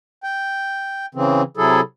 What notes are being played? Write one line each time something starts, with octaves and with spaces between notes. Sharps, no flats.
G5
C#3 E3 C4
C3 F#3 E4 G#4 A4